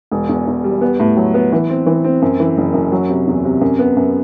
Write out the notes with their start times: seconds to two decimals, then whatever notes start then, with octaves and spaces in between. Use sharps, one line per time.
0.11 E1
0.29 E2
0.47 E2
0.64 G3
0.81 B3
1.00 A2
1.17 F#3
1.34 B3
1.52 E3
1.69 C4
1.86 E3
2.04 C4
2.22 F#2
2.40 E3
2.57 F#1
2.74 F#2
2.92 F#3
3.09 C3
3.27 E2
3.45 C3
3.61 F#2
3.79 B3
3.97 F#2